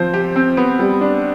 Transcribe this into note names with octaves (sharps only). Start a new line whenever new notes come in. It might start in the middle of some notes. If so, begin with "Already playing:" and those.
Already playing: F3 C4 C5
G4
C4
B3
G3
D4